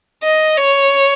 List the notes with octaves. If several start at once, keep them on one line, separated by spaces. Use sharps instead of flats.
D#5
C#5